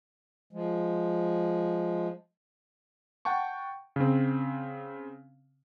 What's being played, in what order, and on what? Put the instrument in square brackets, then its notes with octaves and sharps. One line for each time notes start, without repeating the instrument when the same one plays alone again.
[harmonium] F3 G#3
[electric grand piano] F#5 G5 A5 C#6
C#3 C4